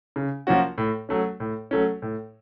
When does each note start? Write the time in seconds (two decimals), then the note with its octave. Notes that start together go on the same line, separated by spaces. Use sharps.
0.16 C#3
0.47 F3 A#3 C#4 F#4
0.78 A2
1.09 F#3 A3 C#4
1.40 A2
1.71 F#3 A3 C#4
2.02 A2